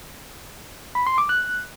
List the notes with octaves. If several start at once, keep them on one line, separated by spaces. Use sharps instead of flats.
B5
C6
D6
F#6